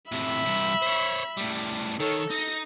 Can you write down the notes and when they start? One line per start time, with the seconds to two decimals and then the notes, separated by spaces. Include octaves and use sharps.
0.12 A2 C3 E5 B5
0.46 G2 C3
0.82 C5 C#5
1.37 A2 G3
2.00 D#3 A4 C#5
2.30 D#4 A#6